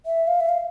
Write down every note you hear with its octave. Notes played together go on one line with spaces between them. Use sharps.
E5
F5
E5
F5